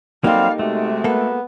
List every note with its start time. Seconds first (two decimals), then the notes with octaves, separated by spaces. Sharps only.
0.24 F#3 G3 A#3 C4 D#4 G4 A4 F5
0.59 C3 G#3 A3 F#4
1.04 A#3 B3 A4